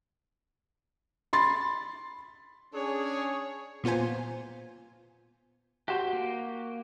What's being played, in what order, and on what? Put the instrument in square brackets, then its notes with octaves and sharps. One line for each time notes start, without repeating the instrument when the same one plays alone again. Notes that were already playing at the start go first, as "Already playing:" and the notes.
[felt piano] B5 C6 A6
[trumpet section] C#4 D4 G#4 [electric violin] C#5
[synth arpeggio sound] A#2 B3 F4 C5 G#5
[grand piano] F#4 [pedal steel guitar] G4 C5 G5
[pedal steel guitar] A#3